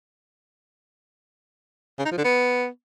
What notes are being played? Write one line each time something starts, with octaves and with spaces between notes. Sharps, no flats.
C#3
D#4
F3
D3
B3